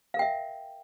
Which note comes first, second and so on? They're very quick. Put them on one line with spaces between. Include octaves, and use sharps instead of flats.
F5 A#4 G5 E5